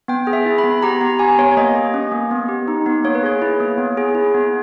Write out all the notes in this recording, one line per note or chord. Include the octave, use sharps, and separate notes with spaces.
B3 G5
G#4
E5
E4
B5
B3
G4 A#5
B3 A#5
G4 G#5
B3 C#5
C#5
A#3 D#5
G4
C#4
A#3
B3
G4
D#4
B3
A#3 C#5
B4
G#4 C#5
E4
A#3
B3
G#4
E4
B3